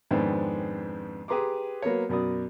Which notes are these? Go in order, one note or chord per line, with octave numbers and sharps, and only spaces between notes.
F2 G#2 D#3 B3 C4 D4
G4 G#4 B4 A#5 C6 D6
F#3 A#3 B3 A#4 C#5
F#2 B2 A#4 D5 D#6